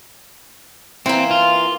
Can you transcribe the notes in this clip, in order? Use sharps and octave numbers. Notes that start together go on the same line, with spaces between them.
E3 A#3 C4
F4